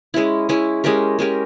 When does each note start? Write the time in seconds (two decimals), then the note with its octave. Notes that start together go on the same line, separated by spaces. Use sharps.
0.14 G#3 C#4 E4
0.49 G#3 C#4 E4
0.84 G#3 C#4 G4 A#4
1.19 G#3 C#4 G4 A#4